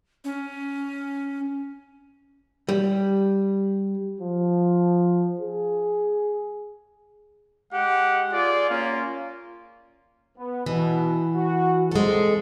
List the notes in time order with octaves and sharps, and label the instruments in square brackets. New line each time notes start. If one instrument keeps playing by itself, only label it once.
[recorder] C#4
[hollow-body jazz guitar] G3
[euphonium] F3
G#4
[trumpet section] G#3 G4 F#5
F4 G#4 D5
A#3 C#4 F4
[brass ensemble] B3
[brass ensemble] B2 [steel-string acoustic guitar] E3
[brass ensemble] F#4
[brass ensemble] D#2 D3 C4 [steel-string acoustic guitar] G#3 A4